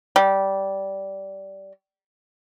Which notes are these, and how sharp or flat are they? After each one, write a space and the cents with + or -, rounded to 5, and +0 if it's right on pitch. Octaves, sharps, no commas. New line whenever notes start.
G3 -15